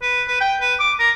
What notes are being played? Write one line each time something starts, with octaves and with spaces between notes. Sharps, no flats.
B4
B4
G5
B4
D6
A#4